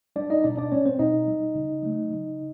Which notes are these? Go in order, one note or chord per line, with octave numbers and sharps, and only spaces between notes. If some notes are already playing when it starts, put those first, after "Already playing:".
G3 D4 D5
D#4 D#5
B2 D4 D5
D4 D5
G3 C#4 C#5
C4 C5
B2 D#4 D#5
G3
C#3
F#3 A3
C#3